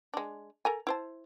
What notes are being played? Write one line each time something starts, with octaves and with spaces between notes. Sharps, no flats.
G#3 D4
A4 A#4 G#5
E4 C5 A5